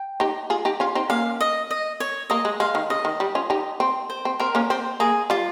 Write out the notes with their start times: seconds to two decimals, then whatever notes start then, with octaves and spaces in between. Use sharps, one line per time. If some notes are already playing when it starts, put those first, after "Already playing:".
Already playing: G5
0.20 D#4 G4
0.50 F4 G#4
0.65 D#4 G4
0.80 C#4 F4
0.95 C4 D#4
1.10 A#3 C#4 F5
1.40 D#5
1.71 D#5
2.00 C#5
2.30 A#3 D#5
2.45 G#3
2.60 G#3 F5
2.75 D#3
2.90 C#3 D#5
3.05 D#3
3.20 G3
3.35 C#4 F4
3.50 D#4 G4
3.80 C4
4.10 C5
4.25 C4
4.40 C4 A#4
4.55 A#3 C#4
4.70 C4 C5
5.00 A#3 G#4
5.30 G3 F4